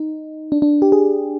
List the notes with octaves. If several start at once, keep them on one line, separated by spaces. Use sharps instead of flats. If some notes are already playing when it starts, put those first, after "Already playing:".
Already playing: D#4
D4
D4
G4
G#4